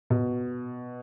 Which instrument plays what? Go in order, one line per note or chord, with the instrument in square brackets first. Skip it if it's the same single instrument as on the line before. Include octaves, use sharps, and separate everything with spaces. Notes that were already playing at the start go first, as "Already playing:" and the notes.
[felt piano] B2